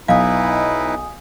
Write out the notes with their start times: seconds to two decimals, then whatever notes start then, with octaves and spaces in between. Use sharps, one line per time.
0.08 B1 D#4 E4 B4 F5 G#5 D#6